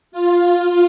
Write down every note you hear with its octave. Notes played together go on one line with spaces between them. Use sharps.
F4